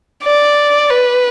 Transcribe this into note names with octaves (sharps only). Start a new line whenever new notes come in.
D5
B4